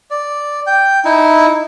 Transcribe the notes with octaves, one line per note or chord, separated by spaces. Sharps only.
D5
G5
D#4 E4